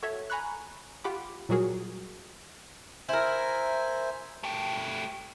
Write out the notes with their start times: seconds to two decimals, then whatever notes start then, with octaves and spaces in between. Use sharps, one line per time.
0.02 F#4 A4 C#5 E5
0.30 G#5 A#5 B5 C#6 F#6
1.04 F4 G4 F#5 B5 D6
1.49 A#2 F#3 G3 F#4 G#4 A#4
3.09 E4 A#4 C5 E5 G#5
4.43 A3 G4